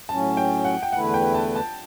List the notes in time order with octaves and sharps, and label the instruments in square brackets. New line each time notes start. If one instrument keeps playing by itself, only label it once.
[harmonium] A2 F#3 C#4 [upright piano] A5
[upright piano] G5
F#5
G5
[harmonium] E2 D3 A3 E4 B4 [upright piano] F#5
[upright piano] G5
A5
A5